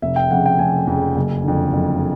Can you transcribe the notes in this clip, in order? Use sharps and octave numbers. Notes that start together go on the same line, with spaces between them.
F1 E5
G5
F2 C#3 F#5
G5
F1 G#5
F2 C#3
F#1
F2 D3
F#1